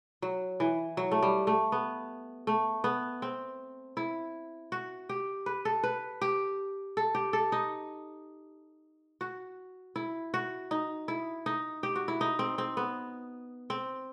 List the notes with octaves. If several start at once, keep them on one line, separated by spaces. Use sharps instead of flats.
F#3
E3
F#3
A3
G3
A3
B3
A3
B3
C4
E4
F#4
G4
B4
A4
B4
G4
A4
G4
A4
D#4
F#4
E4
F#4
D#4
E4
D#4
G4
F#4
E4
D#4
C4
C4
B3
C4